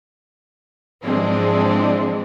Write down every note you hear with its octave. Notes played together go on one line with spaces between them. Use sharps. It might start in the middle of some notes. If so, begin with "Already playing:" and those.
G#2 E3 F3 G#3 C4 D4